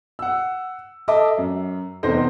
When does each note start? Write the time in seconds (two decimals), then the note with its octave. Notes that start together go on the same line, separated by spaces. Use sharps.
0.19 F#5 E6
1.08 A4 D#5 E5 A5 D6
1.38 F#2
2.03 F1 E2 C4 D#4 C5 A#6